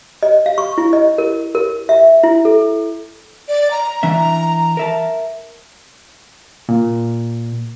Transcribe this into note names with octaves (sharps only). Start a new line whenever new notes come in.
D#5
F5
C#6
E4
D#5
A#4
A#4
E5
E4
A4
D5
A#5
E3 D4 E5
A#4 E5 A5
A#2